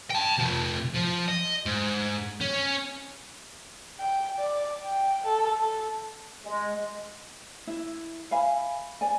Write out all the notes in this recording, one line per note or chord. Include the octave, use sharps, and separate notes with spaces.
G5 A5
C3 F3
F3
D#5
G#2
C#4
G5
D5
G5
A4
A4
G#3
E4
E5 F5 G#5 B5
D5 G#5